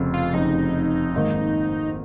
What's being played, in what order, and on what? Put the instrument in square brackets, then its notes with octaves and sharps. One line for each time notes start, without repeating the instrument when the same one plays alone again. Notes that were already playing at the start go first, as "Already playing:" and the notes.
Already playing: [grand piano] F1 F2 C#3
[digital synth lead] F4
[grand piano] F1 F2 C#3 [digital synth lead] D#4
[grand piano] G#1 G#2 D#3 A#3